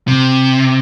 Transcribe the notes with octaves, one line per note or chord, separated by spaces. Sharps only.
C3